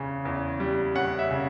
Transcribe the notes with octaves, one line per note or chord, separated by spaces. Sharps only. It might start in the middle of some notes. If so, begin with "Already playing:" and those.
Already playing: E2 C#3 C#4
E2
G3
C#4 F#5
E5
C#3